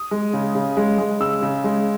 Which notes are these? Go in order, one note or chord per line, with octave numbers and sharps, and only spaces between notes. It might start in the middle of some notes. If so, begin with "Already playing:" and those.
Already playing: D#6
G#3
C#3
C#3
G#3
G#3
C#3 E6
C#3
G#3